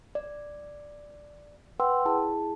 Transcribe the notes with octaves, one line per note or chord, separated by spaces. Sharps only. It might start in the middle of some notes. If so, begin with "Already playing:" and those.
D5
B4 F#5 G5 C6 E6
E4 G#4 A5